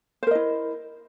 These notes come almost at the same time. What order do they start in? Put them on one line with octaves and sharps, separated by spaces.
C5 A#4 D#5 E4